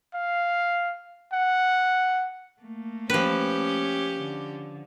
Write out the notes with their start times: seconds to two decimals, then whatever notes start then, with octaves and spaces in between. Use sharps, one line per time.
0.14 F5
1.33 F#5
2.62 A3 A#3
3.10 F3 C#4 G4 B4
4.18 D3